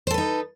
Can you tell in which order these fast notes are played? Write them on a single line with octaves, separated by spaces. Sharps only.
C5 A4 B4 D#4